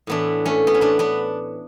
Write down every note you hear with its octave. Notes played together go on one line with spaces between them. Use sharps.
A2 E3 B3 D4
A3 C#4
B3
C#4
B3 D4
B3 D4